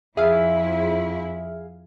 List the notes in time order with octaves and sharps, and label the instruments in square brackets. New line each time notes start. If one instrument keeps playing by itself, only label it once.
[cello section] F2 E4 [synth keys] G#4 F5 [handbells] E5